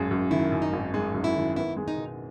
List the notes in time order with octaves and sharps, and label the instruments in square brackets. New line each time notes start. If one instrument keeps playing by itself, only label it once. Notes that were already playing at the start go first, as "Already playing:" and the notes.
Already playing: [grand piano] G#1 F#2 G#3 [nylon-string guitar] C#4
[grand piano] F#2
[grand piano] D#3 [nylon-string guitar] E4
[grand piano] F#2
[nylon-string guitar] D#4
[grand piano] G#1
[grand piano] G#3 [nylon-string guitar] D#4
[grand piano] F#2
[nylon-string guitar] E4
[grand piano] D#3
[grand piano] B3 [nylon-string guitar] E4
[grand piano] G#3
[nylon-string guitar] D#4
[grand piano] B2